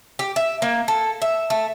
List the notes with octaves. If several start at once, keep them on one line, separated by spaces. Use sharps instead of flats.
G4
E5
A#3
A4
E5
A3